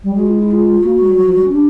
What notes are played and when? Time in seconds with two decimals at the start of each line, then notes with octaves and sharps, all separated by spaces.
0.04 G3
0.15 G#3 F#4
0.27 F4
0.39 E4
0.51 F4
0.83 A#3 F#4
1.00 G#3
1.09 G3
1.17 F#3
1.26 F3
1.35 G3
1.44 C#4
1.52 D4 G4